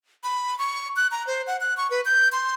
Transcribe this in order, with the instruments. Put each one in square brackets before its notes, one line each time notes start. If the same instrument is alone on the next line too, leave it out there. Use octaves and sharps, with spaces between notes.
[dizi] B5
C#6
F#6
A#5
C5
F#5
F#6
C#6
B4
G6
C6